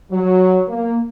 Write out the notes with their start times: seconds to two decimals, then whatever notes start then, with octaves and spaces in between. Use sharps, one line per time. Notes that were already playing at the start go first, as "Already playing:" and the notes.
0.11 F#3
0.68 A#3